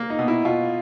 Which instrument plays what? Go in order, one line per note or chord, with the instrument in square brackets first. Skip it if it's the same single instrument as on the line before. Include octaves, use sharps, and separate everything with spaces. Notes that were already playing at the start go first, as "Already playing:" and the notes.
Already playing: [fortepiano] A#3
[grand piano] D#4
[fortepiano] B2
[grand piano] E4
[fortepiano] B2 [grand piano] F4